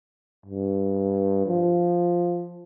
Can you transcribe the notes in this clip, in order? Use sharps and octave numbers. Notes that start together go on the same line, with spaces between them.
G2
F3